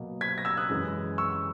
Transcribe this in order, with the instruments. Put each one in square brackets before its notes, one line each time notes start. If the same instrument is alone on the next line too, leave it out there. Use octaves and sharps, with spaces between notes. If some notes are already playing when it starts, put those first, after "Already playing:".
Already playing: [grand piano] B2 F#3 A#3
G#6 B6
A#6
E6 G#6
D#6 F#6
F#2 E3 G#3
C#6 E6